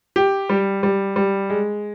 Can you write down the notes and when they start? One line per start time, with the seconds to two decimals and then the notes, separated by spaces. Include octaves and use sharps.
0.16 G4
0.49 G3
0.83 G3
1.16 G3
1.50 G#3